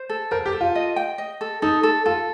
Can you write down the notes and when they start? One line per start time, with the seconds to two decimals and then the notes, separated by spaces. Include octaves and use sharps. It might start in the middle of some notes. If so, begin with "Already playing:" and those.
Already playing: C5
0.10 A4
0.31 A#4 C5
0.46 G4
0.53 A4
0.61 F4
0.75 D#5
0.96 G5
1.18 D#5
1.41 A4
1.62 D#4 A4
1.83 A4
2.06 F4 A4